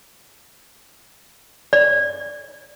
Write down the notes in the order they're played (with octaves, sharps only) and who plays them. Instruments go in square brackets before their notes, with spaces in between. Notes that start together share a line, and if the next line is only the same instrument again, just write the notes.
[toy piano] D5